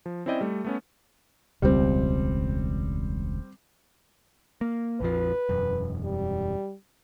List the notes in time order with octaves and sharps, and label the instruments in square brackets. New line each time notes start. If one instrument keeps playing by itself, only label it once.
[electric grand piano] F3
C4 C#4 E4 D5 D#5 G5
G3 A3
A3 B3 C#4
[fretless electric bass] E1 C#2 [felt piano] G3 C4
[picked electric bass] A#3
[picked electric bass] A#1 F2 F3 [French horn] B4
[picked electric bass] E1 F#2
[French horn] G3